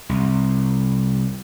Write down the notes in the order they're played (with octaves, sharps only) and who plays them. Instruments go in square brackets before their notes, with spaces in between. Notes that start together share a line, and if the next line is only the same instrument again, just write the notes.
[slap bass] C2